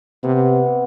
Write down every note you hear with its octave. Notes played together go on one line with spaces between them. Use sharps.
C3 B3